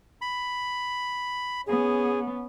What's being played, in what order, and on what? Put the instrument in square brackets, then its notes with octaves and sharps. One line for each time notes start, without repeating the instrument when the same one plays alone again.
[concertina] B5
[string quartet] B3 C#4 [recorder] G#4